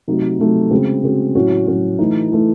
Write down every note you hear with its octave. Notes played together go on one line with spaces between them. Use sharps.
C3 F#3 A3 D#4 F#4
C3 F#3 A3 D#4 F#4
C#3 G#3 C4 F#4
C#3 G#3 C4 F#4
A2 F#3 C#4 F#4
A2 F#3 C#4 F#4
E3 A3 D#4
E3 A3 D#4